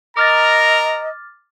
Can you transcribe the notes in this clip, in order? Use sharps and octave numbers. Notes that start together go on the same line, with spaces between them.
A#4 D#5 A#5 D6 F6 A6